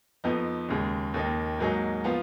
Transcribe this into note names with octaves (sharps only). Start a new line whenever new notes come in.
F2 F3 B3 D#4
D#2 C#3 G#3
D#2 D#3 A#3 D#4
G#2 F#3 A#3 D#4 G#4
F3 B3 F4